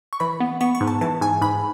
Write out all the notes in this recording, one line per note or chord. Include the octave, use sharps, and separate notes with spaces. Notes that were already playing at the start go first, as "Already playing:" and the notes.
C#6
E3 B5
B3
B3 C#6
C#6
G#2
A5
E3 A5
G#2 G#5
G#2 B5